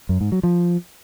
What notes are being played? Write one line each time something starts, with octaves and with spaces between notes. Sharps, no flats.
F#2
G#2
F#3
F3